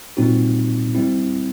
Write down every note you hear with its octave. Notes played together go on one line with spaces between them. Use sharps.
A#2 G3 C4 D#4 F#4
G3 C4 E4